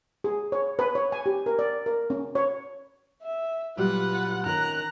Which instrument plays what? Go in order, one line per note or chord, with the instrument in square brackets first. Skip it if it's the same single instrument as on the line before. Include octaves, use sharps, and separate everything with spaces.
[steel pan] G#4
C#5
B4
C#5
G#5
G4
A#4
D5
A#4
C#4
C#5
[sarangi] E5
[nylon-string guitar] A#2 F#3 G3 [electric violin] F4 F#5 [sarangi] B4
[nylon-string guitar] D#3 C#4 [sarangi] A#5 [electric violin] F#6